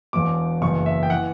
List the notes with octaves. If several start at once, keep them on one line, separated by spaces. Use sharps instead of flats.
E1 E2 B2 D6
F#1 E2 B2 C#6
E5
G5
E3 F#5